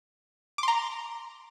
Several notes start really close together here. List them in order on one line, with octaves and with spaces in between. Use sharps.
D6 C6 A#5